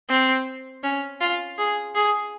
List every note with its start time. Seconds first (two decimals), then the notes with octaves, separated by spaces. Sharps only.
0.09 C4
0.83 C#4
1.20 F4
1.58 G#4
1.95 G#4